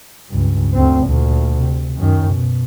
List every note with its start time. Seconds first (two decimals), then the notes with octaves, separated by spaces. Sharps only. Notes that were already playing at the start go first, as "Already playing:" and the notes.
0.29 C#2 G2
0.74 D2 C4
1.06 D2 A#2
1.58 C3
1.97 F#2 D#3
2.33 B2